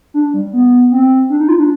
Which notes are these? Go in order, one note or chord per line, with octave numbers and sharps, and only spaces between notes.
D4
G3
B3
C4
D4
D#4
F4
D4